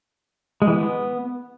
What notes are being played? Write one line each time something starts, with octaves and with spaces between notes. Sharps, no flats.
G#3
E3
B3